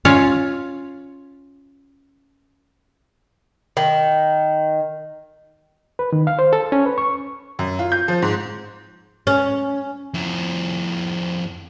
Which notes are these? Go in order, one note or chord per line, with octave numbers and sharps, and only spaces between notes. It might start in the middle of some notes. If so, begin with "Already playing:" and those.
C#4 F4 C#5 F5
D#3
B4
D#3
F5
C5
A4
C#4
B4
C#6
F#2
F4
G6
F3
G#2
C#4
F2 E4